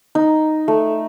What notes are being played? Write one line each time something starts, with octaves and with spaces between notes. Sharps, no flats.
D#4
A3